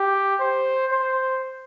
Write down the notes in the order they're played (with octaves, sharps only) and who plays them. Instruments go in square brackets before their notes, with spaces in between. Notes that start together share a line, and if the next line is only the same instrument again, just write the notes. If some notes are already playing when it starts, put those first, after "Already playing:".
Already playing: [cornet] G4
C5
C5